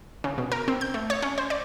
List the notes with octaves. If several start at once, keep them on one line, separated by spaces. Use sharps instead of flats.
C#3
B2
A#4
C4
G6
A3
C#5
C#4
C5
D5